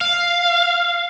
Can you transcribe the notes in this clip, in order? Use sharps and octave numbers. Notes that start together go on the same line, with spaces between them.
F5